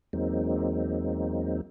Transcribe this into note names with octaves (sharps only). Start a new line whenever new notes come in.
E2 F#3 G#3 A#3 C4 D#4